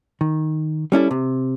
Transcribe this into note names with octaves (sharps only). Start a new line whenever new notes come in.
D#3
G3 C#4 E4 A4
C3